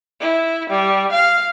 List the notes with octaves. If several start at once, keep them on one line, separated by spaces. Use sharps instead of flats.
E4
G3
F5